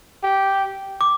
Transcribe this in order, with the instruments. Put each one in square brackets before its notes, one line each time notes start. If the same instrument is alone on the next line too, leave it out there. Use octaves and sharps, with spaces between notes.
[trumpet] G4
[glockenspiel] D6